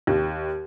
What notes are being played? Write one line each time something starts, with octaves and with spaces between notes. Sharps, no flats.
D#2